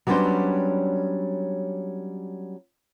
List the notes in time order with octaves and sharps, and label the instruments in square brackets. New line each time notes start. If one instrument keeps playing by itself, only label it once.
[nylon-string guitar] F#3 G3 B3 C#4 D4 C5